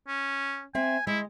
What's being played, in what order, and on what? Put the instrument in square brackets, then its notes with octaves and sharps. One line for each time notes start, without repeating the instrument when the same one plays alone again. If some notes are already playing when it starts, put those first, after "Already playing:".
[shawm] C#4
[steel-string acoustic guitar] C4 E5 [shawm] G#5
[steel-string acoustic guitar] G#3 [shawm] E4